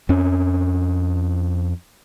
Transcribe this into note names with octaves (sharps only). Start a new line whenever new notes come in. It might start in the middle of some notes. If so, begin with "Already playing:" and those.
F2 C#4